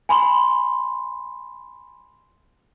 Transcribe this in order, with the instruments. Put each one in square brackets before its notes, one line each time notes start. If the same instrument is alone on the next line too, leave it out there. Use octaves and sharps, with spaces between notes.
[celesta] G#5 B5 C6